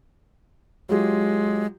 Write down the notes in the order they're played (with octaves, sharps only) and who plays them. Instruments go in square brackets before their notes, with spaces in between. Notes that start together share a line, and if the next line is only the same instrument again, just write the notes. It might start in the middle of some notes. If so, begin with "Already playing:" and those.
[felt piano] F#3 F4 G4 [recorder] G#3